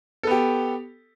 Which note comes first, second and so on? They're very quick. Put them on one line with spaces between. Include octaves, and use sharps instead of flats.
A4 B3 G4